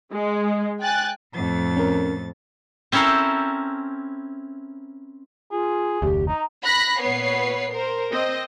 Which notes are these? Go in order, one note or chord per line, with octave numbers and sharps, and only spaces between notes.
G#3
G5 G#5 F#6 A6
F2 A2 A6
C#4 A#4
C4 C#4 E4 A4 A#4 C5
F4 G#4
F1 D2 G4
D#4 A#5
B5 F#6 A#6 B6
A#2 B3 B4 C#5 C7
A#4 C5
C4 D#5